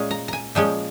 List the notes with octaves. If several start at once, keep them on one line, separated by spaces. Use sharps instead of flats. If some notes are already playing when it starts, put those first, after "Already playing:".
Already playing: A#2 G#3 C#4
A#5
G#5 A#5
A#2 F3 G#3 C#4 G5